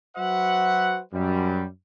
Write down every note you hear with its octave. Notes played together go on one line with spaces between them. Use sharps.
F#3 F#4 B4 C5 E5 F#5
F#2 G3